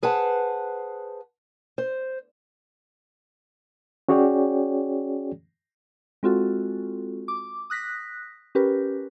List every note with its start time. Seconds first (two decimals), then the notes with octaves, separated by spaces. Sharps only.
0.03 G#4 B4 C5 F#5 A5
1.78 C5
4.09 C#4 F#4 G#4 C#5 D5 G5
6.23 G#3 C4 F4 F#4 A4
7.28 D6
7.70 D#6 F#6 A#6 B6
8.55 C#4 G4 A#4 B4